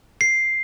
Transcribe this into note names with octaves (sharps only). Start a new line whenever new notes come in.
C7